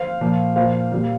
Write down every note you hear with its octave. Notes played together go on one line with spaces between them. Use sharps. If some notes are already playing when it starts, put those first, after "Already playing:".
Already playing: C5 F5
A#2 F3
A#2 F3 C5 F5
A#2 G3